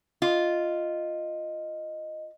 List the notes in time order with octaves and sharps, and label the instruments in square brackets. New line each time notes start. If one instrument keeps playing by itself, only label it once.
[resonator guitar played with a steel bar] F4 [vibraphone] D#5